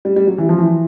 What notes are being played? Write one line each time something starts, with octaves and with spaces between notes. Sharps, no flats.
G3
G3
F#3
E3
F3
E3